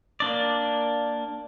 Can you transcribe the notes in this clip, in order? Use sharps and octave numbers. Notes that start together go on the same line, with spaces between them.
A#3 D4 D5